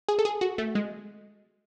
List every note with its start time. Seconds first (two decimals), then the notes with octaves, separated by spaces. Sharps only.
0.09 G#4
0.19 A4
0.25 G#4
0.41 F#4
0.58 A3
0.75 G#3